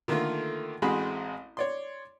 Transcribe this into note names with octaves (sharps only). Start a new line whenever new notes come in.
D3 D#3 A3 A#3 F4
A1 G#3 C4 F#4 G#4 B5
C#5 D5 C6